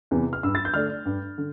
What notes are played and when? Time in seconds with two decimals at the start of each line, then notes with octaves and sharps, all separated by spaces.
0.11 E2 C3 E3
0.33 F6
0.43 G2 E6
0.55 A6
0.65 G6
0.74 D3 A3 D4 F6
1.05 G2
1.38 D3